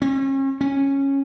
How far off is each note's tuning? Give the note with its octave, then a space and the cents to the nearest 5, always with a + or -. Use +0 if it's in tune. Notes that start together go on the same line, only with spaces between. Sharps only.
C#4 -40
C#4 -10